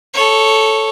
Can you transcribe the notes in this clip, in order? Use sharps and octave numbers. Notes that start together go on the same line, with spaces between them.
A4 C#5